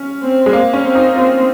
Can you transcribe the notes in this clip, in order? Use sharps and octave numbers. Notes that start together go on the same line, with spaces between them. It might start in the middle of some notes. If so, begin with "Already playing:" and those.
Already playing: C#4
C4
G#3
A#3
C#4
C4
D#4
C4 F4